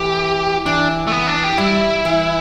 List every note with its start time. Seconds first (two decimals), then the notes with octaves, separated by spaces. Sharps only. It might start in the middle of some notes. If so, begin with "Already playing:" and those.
Already playing: E3 A3 G4
0.66 E3 D4
1.07 A3
1.12 B3
1.27 D4
1.44 G4
1.58 G3 E4
2.05 E3